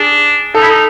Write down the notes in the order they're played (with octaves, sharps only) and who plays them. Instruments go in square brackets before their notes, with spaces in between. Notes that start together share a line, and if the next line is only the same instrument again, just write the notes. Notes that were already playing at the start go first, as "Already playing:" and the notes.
Already playing: [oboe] D4 [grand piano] G#4
[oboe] D#4 [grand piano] A4
[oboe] E4
D#4